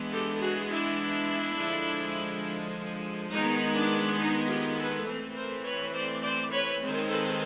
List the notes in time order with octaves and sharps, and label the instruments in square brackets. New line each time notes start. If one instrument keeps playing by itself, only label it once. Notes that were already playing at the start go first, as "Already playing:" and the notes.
Already playing: [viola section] E3 G#3 B3 D4
G4 A4
F#4 G#4
D4 E4
D3 F3 G#3
D#3 G#3 B3 D#4
D4
D#4
F4 G4
A4 B4
E3 A3 C4
A#4 C5
B4 C#5
C5 D5
C5 D5
B4 C#5
D#3 G#3 C4
A4 B4